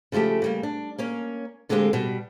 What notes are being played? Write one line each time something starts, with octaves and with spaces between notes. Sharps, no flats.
C#3 F3 G3 A3 G4
C#3 G3 A#3
D4
A#3 C#4 C#5
D2 D3 G#3 A#3 C4 G4
B2 G3